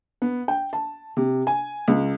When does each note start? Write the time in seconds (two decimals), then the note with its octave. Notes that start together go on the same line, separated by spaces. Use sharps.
0.22 B3
0.48 G5
0.73 A5
1.17 C3
1.47 G#5
1.88 C#2